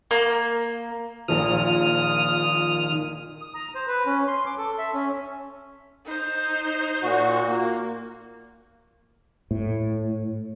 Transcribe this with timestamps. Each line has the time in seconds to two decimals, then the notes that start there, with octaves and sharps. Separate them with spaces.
0.11 A#3
1.28 A#1 A#2 D#3 F3 D#6 F6
3.41 D#6
3.54 A#5
3.75 C5
3.87 B4
4.06 C#4
4.27 C6
4.46 D6
4.58 A4
4.78 E5
4.93 C#4
6.06 D#4 C5
7.02 A#2 F#4
7.47 A#3
9.51 A2